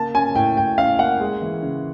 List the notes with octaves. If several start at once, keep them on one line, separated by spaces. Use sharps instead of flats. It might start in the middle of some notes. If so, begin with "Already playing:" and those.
Already playing: C#3 A#3 A5
C#4 G#5
A2 G5
A2 G5
C#4 F5
A#3 F#5
G#3
E3
C#3